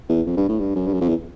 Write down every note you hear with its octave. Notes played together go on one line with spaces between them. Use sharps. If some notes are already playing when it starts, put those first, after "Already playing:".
E2
F2
G2
A2
G2
F#2
G2
F#2
F2
E2